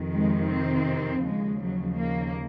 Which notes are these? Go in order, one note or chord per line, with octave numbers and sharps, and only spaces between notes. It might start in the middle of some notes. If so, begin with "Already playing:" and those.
Already playing: F2 C3 D#3
G#3
C4
D#2 C#3 F3 G#3
F#3
A#3